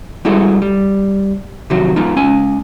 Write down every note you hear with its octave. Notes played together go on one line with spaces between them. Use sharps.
G3 G#3 E4 F#4 G#4 A4
G3
C3 D#3 F3 F#3 F#4
G#3 B3 D#4 F4
G#3 C#4 G#5